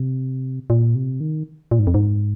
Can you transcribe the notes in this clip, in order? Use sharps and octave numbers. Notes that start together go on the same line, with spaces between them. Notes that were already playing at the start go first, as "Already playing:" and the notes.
Already playing: C3
A#2
C3
D#3
A#2
G#2
F2
G#2